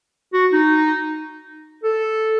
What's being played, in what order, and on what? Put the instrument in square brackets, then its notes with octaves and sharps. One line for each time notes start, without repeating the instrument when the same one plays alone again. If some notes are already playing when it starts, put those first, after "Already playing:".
[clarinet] F#4
D#4
A4